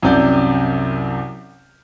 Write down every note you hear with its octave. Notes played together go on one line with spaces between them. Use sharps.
C2 F#2 C3 D5 G6